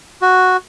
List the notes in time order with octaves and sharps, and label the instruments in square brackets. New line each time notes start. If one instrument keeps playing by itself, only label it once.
[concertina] F#4